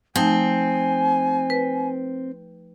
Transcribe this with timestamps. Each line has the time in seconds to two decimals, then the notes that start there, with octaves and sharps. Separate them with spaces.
0.16 F3 A3 C4 D#4 G#5
1.50 B4